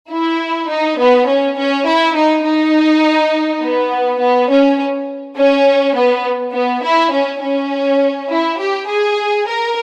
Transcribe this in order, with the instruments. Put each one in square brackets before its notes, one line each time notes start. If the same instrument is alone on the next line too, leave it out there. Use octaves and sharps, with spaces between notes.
[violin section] E4
D#4
B3
C#4
C#4
E4
D#4
D#4
B3
B3
C#4
C#4
B3
B3
E4
C#4
C#4
E4
G4
G#4
A#4